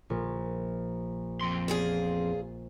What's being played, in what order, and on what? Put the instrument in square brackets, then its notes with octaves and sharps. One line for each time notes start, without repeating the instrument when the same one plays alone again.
[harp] A#1
[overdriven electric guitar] F2 C6
[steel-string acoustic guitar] E2 F4 G#4